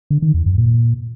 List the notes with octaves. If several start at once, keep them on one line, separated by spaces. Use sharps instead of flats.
D3
D#3
E2
F#2
A#2